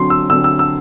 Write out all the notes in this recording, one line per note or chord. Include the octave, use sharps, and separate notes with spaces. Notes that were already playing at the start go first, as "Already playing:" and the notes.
Already playing: D3 F#3 C4 C6
E6
D3 F#3 C4 E6
E6
E6